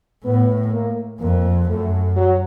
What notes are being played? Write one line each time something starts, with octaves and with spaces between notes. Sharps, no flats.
A2 B3
A#3
F2 A#3
F#2 A3
F#3